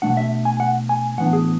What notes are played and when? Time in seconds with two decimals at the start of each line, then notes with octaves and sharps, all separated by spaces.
0.02 B2 F#3 A3 D4 F#5
0.17 E5
0.45 G#5
0.60 F#5
0.89 G#5
1.18 A2 E3 B3 D4 F#5
1.33 G#4